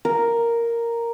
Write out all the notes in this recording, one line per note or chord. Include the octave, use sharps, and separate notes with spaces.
A#4